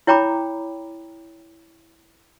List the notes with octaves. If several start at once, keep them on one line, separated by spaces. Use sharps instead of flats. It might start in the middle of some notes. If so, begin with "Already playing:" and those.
E4 C#5 G5 A#5 B5 D6